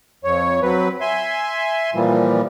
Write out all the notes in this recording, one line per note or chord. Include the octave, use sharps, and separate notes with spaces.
F2 C#5
F#3 C4 B4
E5 G#5 C6
A#2 E3 F3 G3